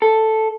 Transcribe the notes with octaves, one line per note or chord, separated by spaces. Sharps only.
A4